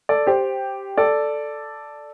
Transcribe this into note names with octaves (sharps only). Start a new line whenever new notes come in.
A4 D5
G4 C5
A4 D5